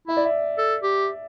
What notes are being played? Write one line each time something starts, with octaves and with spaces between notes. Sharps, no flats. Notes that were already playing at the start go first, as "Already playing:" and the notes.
E4 E5
D5
E5
A4
G4